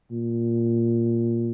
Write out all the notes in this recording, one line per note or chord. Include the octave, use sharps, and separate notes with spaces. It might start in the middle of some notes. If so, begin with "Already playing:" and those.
A#2